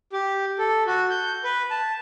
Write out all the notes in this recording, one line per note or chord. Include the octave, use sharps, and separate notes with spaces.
G4
A4
F#4
G6
B4
A5